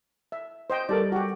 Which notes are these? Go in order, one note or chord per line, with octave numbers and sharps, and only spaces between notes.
E5
C5 D#5 G5
G3 A4 A#4 D5
F#4 G4